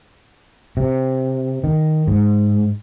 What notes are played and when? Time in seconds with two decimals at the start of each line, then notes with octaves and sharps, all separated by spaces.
0.77 C3
1.64 D#3
2.07 G#2